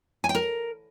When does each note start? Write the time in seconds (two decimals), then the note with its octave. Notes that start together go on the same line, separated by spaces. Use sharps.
0.24 G#5
0.29 G5
0.35 A#4